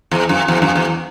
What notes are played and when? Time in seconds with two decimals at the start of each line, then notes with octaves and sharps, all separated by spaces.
0.11 E2
0.29 F#2
0.48 E2
0.62 F#2
0.76 E2